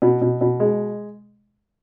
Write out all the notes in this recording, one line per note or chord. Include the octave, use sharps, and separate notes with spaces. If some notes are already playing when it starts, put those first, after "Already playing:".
B2
B2
B2
G#3